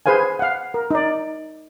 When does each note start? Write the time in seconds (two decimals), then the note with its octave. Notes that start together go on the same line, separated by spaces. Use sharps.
0.06 G#4 B4 C5 F5 G#5
0.39 F5 F#5
0.74 A#4
0.91 D#4 D5